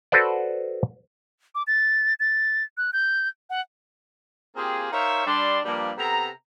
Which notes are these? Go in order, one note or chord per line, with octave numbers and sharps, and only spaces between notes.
F#4 A4 B4 C5 D5
D6
A6
A6
F#6
G6
F#5
A#3 C4 F4 G4 G#4
D#4 A#4 C5 C#5 E5 F5
G3 D4 C6
G2 F3 G3 A#3
C3 B3 A4 A#5